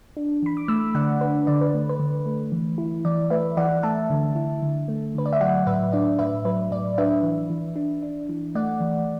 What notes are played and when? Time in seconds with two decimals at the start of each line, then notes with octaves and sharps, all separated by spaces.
0.17 D4
0.43 E3 B5
0.57 D6
0.68 A3 B5 E6
0.95 D3 D5 F#5
1.21 D4 B4
1.47 D3 D5
1.61 B4
1.74 A3
1.89 B4
2.00 D3
2.26 A3
2.52 E3
2.78 E4
3.05 E3 D5
3.30 A3 B4 E5
3.57 E3 D5 F#5
3.83 A3 E5 A5
4.10 D3
4.35 E4
4.62 D3
4.88 A3
5.15 D3 B4
5.26 D5
5.33 E5
5.41 F#3 D5 F#5
5.67 A2 B4 E5
5.93 D4 D5
6.19 A2 B4 E5
6.45 F#3 B4
6.71 A2 D5
6.98 D4 B4 E5
7.23 E3
7.50 E3
7.76 D4
8.03 D4
8.29 E3
8.55 A3 D5 F#5
8.81 E3